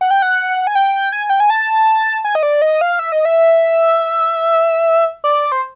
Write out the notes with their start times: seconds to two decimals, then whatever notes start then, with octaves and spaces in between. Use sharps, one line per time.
0.01 F#5
0.11 G5
0.22 F#5
0.67 G#5
0.75 G5
1.12 G#5
1.30 G5
1.40 G#5
1.50 A5
2.25 G#5
2.35 D#5
2.43 D5
2.62 D#5
2.81 F5
2.99 E5
3.12 D#5
3.25 E5
5.24 D5
5.52 C5